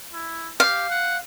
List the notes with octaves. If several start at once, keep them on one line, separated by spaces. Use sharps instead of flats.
E4
G4 F5
F#5